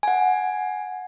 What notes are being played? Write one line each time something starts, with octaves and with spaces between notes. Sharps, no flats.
F#5 G#5